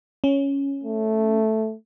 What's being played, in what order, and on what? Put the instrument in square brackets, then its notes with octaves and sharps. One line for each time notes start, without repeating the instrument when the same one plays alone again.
[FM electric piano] C#4
[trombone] A3